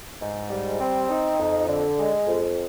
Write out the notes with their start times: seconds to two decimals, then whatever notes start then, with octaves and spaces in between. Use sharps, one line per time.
0.21 G#2
0.50 G3
0.80 C4
1.09 D#4
1.39 F2
1.68 D3
1.98 G#3
2.26 F2